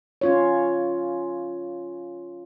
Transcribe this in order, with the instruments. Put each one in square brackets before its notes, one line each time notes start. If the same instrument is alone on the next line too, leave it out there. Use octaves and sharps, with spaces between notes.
[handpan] C#4 F4 C#5